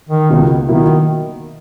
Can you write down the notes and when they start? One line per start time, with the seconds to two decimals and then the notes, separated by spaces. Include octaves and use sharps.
0.09 D#3
0.29 C#2 B2 A#3
0.69 B2 D#3 F#3 A#3 E4